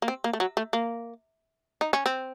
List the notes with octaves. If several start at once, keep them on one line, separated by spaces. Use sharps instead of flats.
A#3
C4
A#3
A3
F#3
A3
A#3
D#4
C#4
C4